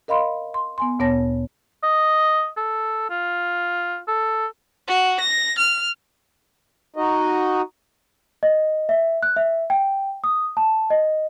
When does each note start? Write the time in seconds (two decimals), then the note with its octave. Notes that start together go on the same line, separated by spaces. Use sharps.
0.08 A#4 D#5 F5 B5 C6
0.54 C6
0.78 B3 G#5 C6
0.99 D2 A#2 B3 C#5 A5 A#6
1.83 D#5
2.57 A4
3.10 F4
4.08 A4
4.87 F#4
5.20 A#6
5.58 F6
6.96 D#4 F#4 D#5
8.43 D#5
8.89 E5
9.23 F#6
9.36 E5
9.70 G5
10.24 D#6
10.57 A5
10.90 D#5